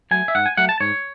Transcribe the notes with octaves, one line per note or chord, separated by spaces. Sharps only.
F#3 A3 G#5
E5
G#2 F#5
G#5
F#3 A3 F#5
A5
G#2 C#5